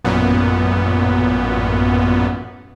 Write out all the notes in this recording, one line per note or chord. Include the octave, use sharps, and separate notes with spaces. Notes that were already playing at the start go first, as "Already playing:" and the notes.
A1 F#2 A#2 B3